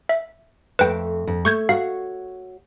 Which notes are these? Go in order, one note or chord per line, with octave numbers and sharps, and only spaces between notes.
E5
F2 A3 B4 G5
F2
A3 C#6 G6 G#6
F#4 C#5 F5